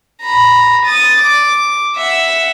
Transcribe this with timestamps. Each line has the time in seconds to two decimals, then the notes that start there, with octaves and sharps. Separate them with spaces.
0.22 A#5 B5
0.86 D#6 A6
1.20 D6
1.97 E5 F#5